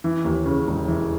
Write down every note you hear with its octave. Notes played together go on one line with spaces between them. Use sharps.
E3
D#2
C#3
E1
E3